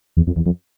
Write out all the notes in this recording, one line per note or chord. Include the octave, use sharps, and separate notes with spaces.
E2
F2
E2
F2